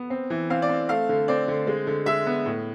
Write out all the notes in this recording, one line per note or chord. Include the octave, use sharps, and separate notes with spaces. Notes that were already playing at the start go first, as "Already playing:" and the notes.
Already playing: B3
C4
E3
C4 F5
D5
C4
A3 F5
D3
C4 D5
D3
G#3
D3
G#3 E5
B3
A2